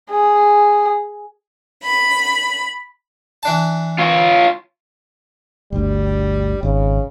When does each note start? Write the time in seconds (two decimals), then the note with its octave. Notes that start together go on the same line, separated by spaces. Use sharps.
0.10 G#4
1.84 B5
3.43 E3 D4 A5
3.98 F4 C#5
5.72 G1 D2 G3
6.63 G#1 C#3